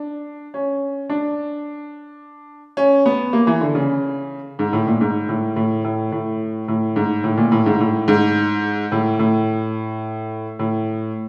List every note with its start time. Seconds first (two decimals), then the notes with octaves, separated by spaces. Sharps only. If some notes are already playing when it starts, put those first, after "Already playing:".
Already playing: D4
0.54 C#4
1.10 D4
2.77 C#4
3.06 B3
3.33 A#3
3.47 E3
3.61 D3
3.75 C#3
4.59 G#2
4.73 A2
4.87 A#2
5.01 G#2
5.29 A2
5.56 A2
5.84 A2
6.12 A2
6.68 A2
6.96 G#2
7.24 A2
7.37 A#2
7.52 A2
7.66 G#2
7.80 A2
8.08 G#2
8.92 A2
9.19 A2
10.59 A2